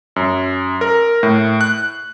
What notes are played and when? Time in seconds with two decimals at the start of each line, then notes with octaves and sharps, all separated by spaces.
0.16 F#2
0.81 A#4
1.23 A2
1.61 F#6